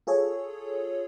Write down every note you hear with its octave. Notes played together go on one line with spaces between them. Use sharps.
F4 G#4 A4 C#5